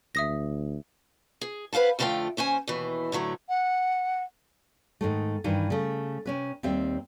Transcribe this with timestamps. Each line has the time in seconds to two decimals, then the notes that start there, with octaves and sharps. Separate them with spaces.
0.15 D2 E5 D#6 A#6
1.41 G#4
1.73 B4 C5 F5 F#5 A5
1.99 F2 D3 E3 A3 F4 G5
2.37 D#2 C#4 C5 G#5
2.67 D#2 B2 E3
3.12 A2 D3 F#3 A3
3.49 F#5
5.01 G#2 D#3 A3
5.44 G2 D#3 E3
5.70 C#3 A3
6.26 C3 C#4 B4
6.63 D#2 G3 C4 E5